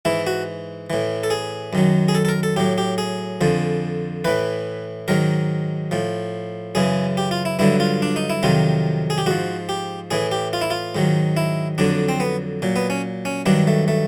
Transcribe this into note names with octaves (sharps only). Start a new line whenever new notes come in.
G#2 E3 E4
F#4
A2 E3
A4
G#4
F#2 D#3 F#3
G#4
A4
A4
A#4
A4
A2 F#3 G4
G4
G#4
F2 D3 F3
A2 E3 B4
G#2 D#3 F#3 A#4
A2 F3
F#2 C#3 E3 G#4
G4
F4
E4
G2 D3 F#3 E4
F4
D4
D#4
E4
F2 C3 D#3 F#3 F4
G#4
G4
G#2 F3 F#4
G4
A2 E3 G#4
G4
F4
E4
F4
G#2 D#3 F#3
E4
F2 D3 F#3 D4
C4
B3
A#2 F#3
B3
C#4
C#4
G2 D#3 F#3 D4
A3
A3